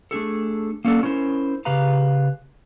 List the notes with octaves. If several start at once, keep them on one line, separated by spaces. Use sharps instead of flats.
A3 D4 G#4 A4
A#3 C#4 D4 A4
C#4 E4 A#4 C5
C#3 G4 B4 F5 A#5